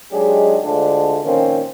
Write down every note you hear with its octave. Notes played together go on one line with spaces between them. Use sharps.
F#3 G#3 D4 D#4 G4 G#4
D2 D3 G#3 A3 D4 F4
A#2 D#3 F3 C4 C#4